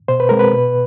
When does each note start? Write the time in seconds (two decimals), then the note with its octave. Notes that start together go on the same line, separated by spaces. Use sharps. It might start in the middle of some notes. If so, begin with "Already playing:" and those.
0.08 B2 C5
0.20 B4
0.29 G#3 C4 A#4
0.39 B4
0.54 B2